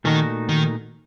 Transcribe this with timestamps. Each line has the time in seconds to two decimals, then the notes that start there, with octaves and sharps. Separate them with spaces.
0.05 A#2 D#3 A3 D#4 F#4
0.49 D#3